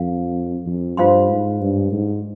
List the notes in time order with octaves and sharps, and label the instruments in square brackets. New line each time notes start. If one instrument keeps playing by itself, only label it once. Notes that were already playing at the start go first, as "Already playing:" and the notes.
Already playing: [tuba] F2 [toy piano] F5
[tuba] F2
[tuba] G2 [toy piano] F4 C5 F5 C6
[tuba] G#2
G2
G#2